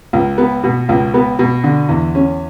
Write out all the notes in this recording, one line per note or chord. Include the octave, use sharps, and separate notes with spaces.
C#2
B3
B2
C#2
B3
B2
D3
E2
C#4